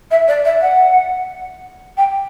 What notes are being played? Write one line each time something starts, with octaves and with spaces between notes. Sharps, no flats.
E5
D5
E5
F#5
G5